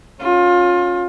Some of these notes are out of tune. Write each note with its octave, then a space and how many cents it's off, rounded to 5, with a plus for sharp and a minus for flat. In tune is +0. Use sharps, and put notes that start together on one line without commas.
C#4 +0 F4 +25